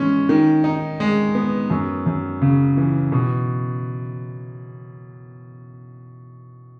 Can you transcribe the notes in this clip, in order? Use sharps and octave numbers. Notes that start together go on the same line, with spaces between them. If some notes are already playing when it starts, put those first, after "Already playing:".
Already playing: E3 G#3 C#4
D#3
D#4
G#3
B3
F#2
F#2
C#3
E3
B2